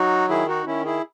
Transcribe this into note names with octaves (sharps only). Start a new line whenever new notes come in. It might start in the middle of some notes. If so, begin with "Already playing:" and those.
Already playing: F#3 D#4 F#4
D#3 E4 G#4
D#4 F#4
D#3 C#4 E4
E4 G#4